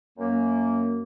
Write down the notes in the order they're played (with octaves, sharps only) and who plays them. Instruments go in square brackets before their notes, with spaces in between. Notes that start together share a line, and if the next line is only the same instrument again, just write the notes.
[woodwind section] F#2 A#3